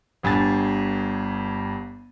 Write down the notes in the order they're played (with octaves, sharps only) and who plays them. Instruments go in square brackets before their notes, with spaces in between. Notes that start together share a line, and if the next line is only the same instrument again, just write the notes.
[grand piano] G1 G2 G#5 A6